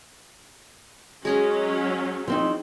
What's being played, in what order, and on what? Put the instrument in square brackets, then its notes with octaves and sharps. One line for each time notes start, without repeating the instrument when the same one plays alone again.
[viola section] F#3 C#4 [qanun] G#3 G#4 D#5
[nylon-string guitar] F3 C4 D#4